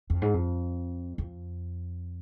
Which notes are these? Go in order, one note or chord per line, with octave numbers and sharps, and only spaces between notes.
F2
G#2
F2
F2